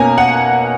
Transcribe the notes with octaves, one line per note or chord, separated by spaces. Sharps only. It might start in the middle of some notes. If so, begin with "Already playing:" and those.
Already playing: B2 A#3 C#4 G#5 A#5
F#5